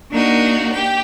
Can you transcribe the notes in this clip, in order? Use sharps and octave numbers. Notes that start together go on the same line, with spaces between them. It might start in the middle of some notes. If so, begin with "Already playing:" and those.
A#3 D4 D#4 F#4 A#4
G4 G5